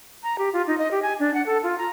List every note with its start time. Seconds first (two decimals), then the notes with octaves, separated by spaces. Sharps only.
0.23 A#5
0.38 G4
0.53 F4
0.67 D#4
0.78 D#5
0.91 G4
1.02 G#5
1.20 D4
1.34 F#5
1.46 A4
1.63 F4
1.78 A#5